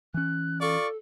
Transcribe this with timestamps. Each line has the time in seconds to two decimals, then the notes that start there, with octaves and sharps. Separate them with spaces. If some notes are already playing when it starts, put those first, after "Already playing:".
0.14 E3 C#4 F#6
0.61 F4 A4 D5 C#6